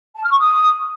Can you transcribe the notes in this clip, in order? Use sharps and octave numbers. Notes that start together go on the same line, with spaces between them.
A5
F6
C#6
D#6